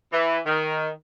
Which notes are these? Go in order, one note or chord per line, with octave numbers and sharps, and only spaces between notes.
E3
D#3